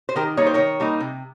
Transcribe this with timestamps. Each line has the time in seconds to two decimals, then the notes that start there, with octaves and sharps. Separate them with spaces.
0.09 C5
0.16 D#3 G4 A#4
0.37 G3 A#3 D#4 C#5
0.46 C5
0.54 D#3 A#4 C#5
0.80 G3 A#3 D#4
1.00 C3